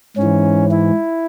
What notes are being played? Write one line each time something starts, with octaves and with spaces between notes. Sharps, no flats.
G#2 C#4
E3
E4